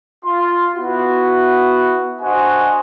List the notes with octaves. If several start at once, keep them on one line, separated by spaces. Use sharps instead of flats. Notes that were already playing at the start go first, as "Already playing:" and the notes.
F4 C6
B3 E4 F#4
D4 F#4 C5 D#5 F#5 G#5